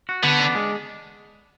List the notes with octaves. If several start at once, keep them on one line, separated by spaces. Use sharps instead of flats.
F#4
D3 B3
D4
G#3